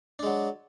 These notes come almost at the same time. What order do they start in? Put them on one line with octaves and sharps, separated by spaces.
D4 G#3 F#3